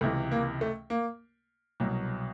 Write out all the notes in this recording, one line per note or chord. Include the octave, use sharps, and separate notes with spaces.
C#2 C3 E3 A3
A#3
A3
A#3
C2 B2 F#3